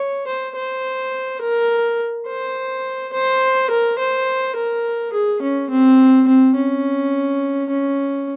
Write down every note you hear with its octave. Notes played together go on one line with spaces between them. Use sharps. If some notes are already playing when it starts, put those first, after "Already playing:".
Already playing: C#5
C5
C5
A#4
C5
C5
A#4
C5
A#4
G#4
C#4
C4
C4
C#4
C#4